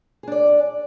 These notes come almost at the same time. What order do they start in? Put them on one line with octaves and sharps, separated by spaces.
G#4 D4 D5